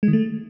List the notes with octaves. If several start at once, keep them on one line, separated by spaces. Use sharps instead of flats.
G#3
D#3
A3